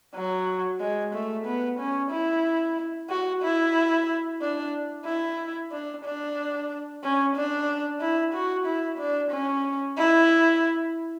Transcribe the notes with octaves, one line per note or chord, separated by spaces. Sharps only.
F#3
G#3
A3
B3
C#4
E4
F#4
E4
D4
E4
D4
D4
C#4
D4
E4
F#4
E4
D4
C#4
E4